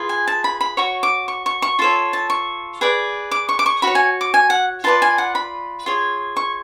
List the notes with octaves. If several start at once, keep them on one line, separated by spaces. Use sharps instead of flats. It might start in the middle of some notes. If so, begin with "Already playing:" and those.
Already playing: F4 G#4 B4
G#5
A5
B5
B5
F#4 C#5 C#6
D6
C#6
C#6
C#6
F4 A4 C#5 A5
A5
C#6
G#4 B4 D5
D6
C#6
D6
C#6
F#4 C#5 B5
G#5
D6
G#5
F#5
F4 B4 D5 A5
G#5
F#5
B5
F4 G#4 C#5
C#6